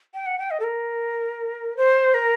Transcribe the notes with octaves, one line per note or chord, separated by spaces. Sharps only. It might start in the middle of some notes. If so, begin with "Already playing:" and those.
G5
F#5
G5
D#5
A4
A#4
C5
A#4